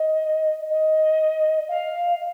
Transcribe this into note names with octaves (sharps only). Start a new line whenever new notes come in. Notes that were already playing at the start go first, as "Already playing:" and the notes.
Already playing: D#5
D#5
F5